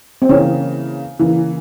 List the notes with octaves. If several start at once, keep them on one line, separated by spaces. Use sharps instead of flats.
C4
C#3 E3 A#3 C#4
C#3 E3 A#3